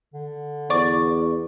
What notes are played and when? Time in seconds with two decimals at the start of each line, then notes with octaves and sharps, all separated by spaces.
0.14 D3
0.70 E2 D5 C#6